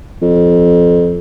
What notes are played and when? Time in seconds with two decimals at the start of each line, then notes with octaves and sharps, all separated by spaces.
0.22 F2